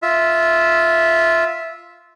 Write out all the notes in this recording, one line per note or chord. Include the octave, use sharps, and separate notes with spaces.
F4 E5